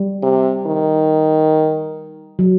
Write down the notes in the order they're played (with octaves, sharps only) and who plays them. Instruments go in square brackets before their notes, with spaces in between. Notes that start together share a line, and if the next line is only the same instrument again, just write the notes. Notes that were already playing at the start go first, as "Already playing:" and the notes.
Already playing: [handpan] G3
[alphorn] C3
D#3
[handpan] F#3